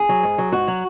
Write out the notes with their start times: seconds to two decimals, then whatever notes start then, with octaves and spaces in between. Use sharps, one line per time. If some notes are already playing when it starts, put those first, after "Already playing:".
Already playing: G#4
0.09 F#3
0.23 G#2
0.38 F#3
0.52 G#2 F#4
0.68 F#3